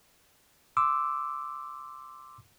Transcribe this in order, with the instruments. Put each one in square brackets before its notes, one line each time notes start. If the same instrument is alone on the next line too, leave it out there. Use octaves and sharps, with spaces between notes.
[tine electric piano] C6 D6 E6